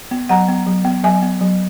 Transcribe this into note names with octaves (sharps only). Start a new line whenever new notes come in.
B3
F#3 F#5 A#5
B3
F#3
B3
F#3 E5 G#5
B3
F#3